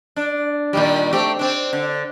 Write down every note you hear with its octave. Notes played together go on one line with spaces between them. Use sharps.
D4
A#2 D#3 G3
A3 C4 G4
C4 D4
D3